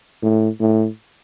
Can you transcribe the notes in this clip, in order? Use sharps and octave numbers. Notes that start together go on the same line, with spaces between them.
A2
A2